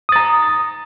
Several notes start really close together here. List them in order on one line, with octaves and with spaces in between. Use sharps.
D#6 A6 A#5